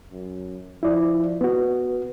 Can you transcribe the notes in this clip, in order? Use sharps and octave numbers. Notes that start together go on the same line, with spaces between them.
F#2
F3 E4 D5
B3 F#4 B4